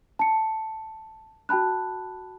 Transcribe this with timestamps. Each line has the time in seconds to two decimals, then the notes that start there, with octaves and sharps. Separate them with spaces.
0.19 A5 C#7
1.49 F#4 G5 A5 B5 F#6